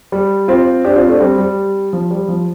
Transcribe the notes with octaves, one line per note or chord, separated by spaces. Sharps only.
G3
C4 F4
D4 G4
C4 F4
A3 D4
G3 C4
G3
F3
G3
F3